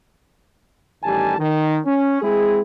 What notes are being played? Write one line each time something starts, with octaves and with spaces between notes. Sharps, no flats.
A1 D#3 G3 G4 G#5 A5
D#3
C#4
G#3 C4 E4 G#4